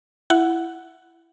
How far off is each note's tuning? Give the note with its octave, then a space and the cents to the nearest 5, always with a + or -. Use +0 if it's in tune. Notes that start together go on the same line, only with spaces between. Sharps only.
E4 +15 F#5 +0